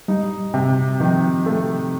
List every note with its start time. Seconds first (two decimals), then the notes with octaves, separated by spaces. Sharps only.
0.08 G3 D#4
0.54 C3
1.00 D#3 F3
1.46 A3